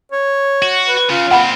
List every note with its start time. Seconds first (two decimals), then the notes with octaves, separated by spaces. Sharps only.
0.12 C#5
0.62 F#4
0.87 B4
1.10 C#3 F4
1.31 A#2 C4 F#5 B5